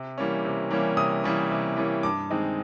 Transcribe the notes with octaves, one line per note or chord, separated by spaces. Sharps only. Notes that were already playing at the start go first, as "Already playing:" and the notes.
Already playing: C3
E3 G3 A#3 C#4
C3
E3 G3 A#3 C#4
C3 D#6
E3 G3 A#3 C#4
C3
E3 G3 A#3 C#4
G2 D6
D#3 G#3 C4 D#4